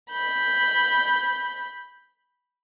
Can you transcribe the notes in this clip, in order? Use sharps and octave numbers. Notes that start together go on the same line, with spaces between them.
B5 G6